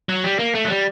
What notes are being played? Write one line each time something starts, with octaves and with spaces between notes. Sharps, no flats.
F#3
G3
A#3
A3
F#3
G3